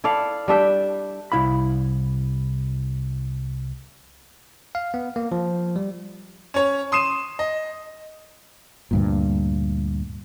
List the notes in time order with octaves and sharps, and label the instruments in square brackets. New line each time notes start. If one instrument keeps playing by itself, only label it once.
[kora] E4 A4 D5 F5
G3 D4 E5 G5
[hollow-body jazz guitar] C2 E4 F5 B5
[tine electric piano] F5
B3
A#3
F3
G3
[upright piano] C#4 C#5
C6 D#6 C7 D#7 E7
D#5
[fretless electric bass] D2 G2 A#2